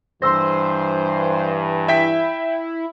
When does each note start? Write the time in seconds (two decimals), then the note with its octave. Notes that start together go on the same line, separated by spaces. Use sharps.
0.22 G2 E3 C5 C6 E6 A#6
1.88 E4 E5 G5 B6